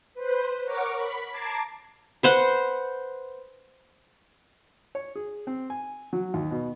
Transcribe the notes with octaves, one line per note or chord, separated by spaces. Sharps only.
B4 C5
A#4 C#5 F#5 C#6 D6
B5
A5 A#5 D6 G#6 C7
B4 C5 F#5
C#5
G#4
C4
G#5
F#3
D#2
B2